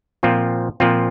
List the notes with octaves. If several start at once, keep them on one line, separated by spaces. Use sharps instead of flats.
A#2 F3 C4 F4
A#2 F3 C4 F4